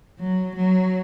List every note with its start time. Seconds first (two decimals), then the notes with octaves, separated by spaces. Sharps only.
0.20 F#3
0.57 F#3